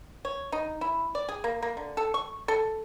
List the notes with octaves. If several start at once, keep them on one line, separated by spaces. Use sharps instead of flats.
C#5
D#4
E4
D5
G#4
A#3
A#3
D3
A4
C#6
A4